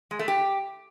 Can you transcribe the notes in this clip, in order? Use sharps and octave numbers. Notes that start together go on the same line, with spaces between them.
G#3
A3
G4